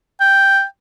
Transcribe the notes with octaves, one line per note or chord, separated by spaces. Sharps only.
G5